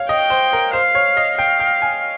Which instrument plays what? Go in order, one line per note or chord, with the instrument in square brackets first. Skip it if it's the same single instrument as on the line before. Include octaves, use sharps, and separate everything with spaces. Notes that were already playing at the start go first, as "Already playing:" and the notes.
Already playing: [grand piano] C#5 F5
[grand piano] D#5 [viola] G5
[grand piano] C5
A#4
[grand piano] C5 [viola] F5
[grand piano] C#5
D#5
[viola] F5 [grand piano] G5
[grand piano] G5
G#5